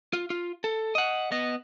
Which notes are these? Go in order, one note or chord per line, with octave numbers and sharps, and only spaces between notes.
F4
F4
A4
D#5 F#5
B3 D#5